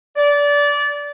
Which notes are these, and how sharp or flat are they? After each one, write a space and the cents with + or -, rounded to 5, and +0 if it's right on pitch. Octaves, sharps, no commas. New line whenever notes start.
D5 -20